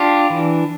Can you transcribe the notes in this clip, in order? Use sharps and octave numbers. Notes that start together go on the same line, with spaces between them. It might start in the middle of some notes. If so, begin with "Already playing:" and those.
Already playing: D4 F4 G4
E3